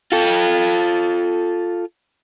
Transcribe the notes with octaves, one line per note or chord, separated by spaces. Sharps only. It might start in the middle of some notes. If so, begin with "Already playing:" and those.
F4 A4